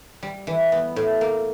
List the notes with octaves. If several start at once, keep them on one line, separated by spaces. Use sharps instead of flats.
G3
E3
B3
A2
A#3